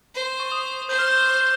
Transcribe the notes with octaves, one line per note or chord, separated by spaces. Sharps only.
C5
C#6
D#6
C5 G6
F6
G6